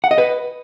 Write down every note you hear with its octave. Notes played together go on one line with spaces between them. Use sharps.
F#5
D#5
B4